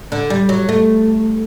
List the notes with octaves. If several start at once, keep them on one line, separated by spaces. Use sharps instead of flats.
D3
G3
F#3
A3